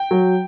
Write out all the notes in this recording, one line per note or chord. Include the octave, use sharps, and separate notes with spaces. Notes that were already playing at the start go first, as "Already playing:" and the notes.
Already playing: G5
F#3